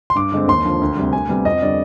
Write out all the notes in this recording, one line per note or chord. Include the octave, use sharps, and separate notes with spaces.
C6
G2 D6
D3 G#3 C4
D#2 C6
D3 F3
D2
C3 G3
D2 G#5
C3 G3 B3
F2 D#5
D3 G3 B3 D5